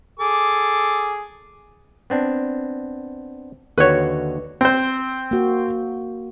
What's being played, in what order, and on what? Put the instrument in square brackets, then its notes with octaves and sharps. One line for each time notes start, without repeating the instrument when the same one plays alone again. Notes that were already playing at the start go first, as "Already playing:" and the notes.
[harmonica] G#4 A4 D6
[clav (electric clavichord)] B3 C4 D4
[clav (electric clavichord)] D#2 D3 F#4 [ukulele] B4 C#5
[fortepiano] C4 C5
[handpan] A#3 F#4